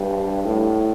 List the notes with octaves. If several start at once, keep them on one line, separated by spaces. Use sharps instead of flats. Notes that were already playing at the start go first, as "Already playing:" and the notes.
Already playing: G2
A2